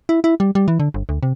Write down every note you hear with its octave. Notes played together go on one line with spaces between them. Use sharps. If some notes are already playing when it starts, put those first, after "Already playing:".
E4
E4
G3
G3
E3
D3
G1
D2
C3